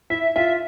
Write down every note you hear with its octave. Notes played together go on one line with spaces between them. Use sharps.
E4 E5
F4 E5